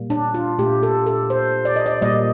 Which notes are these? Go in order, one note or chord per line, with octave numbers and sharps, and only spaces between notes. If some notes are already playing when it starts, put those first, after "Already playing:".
Already playing: A#2 G3 A#3
D4
F4
A#2 A3 G4
A4
A4
C5
D5
D#5
D5
A#2 G3 A#3 D#5